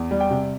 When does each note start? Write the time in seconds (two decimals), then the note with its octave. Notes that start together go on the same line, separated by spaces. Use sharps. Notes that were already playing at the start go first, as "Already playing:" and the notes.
Already playing: E2
0.11 G3
0.20 G5
0.31 C3